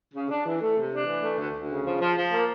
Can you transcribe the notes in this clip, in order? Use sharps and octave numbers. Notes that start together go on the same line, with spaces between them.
C#3
D4
E3
A3
C3
D4
E3
A3
D2
D2
C#3
F3
F3
F3
A#3